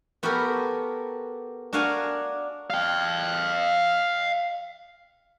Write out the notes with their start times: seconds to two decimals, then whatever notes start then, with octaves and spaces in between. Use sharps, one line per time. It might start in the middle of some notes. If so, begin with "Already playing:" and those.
0.23 B3 F#4 G4 A4 A#4
1.73 D4 F#4 A#4 F5 F#5 G#5
2.70 F5 G5